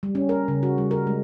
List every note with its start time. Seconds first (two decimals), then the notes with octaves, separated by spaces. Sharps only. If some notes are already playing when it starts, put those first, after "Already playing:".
0.03 G3
0.15 C#4
0.29 A#4
0.48 C#3
0.63 F#4
0.78 G3
0.91 A#4
1.07 G#3